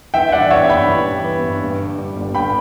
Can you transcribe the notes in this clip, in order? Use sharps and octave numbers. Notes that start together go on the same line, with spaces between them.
E3 E5 G5
E5
G3 D5 F#5
B3 C#5 E5
G2 G5 B5
E3
G3
B3
G2
G2
D3
G3
G1
G2 G5 B5